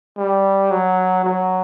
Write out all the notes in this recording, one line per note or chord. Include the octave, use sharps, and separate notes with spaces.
G3
F#3
F#3